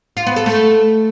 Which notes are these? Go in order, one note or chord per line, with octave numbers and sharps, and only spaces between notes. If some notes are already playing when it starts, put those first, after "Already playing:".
F4
B3
A4
A3